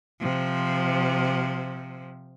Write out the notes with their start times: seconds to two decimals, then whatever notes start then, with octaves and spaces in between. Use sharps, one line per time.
0.20 C3 F3